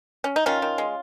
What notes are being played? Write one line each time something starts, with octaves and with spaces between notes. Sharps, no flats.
C#4
D#4
D#3 C#4 F4
D#3
G#3